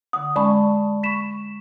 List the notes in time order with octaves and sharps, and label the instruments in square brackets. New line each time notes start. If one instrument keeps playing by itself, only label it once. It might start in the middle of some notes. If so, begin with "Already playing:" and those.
[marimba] D3 F#5 [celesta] D#6
[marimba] G#3 C#4 C#6 [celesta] D5 A5 B5
[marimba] B5 C#6 [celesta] B6 E7